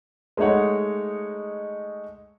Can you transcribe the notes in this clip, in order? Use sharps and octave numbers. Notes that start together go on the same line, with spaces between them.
G#3 A3 D#4 C#5 F#5